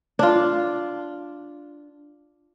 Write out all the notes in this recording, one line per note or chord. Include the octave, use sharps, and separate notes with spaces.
D4 F4